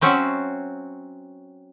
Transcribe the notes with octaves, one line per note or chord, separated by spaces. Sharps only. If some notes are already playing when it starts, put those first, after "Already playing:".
F#3 C4 C#4 F#4 E5